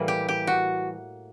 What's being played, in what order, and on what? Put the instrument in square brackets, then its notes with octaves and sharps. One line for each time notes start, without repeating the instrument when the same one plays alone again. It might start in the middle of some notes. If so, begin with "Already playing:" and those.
Already playing: [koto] A2 E3 G3 A#3
G4
G4
F#4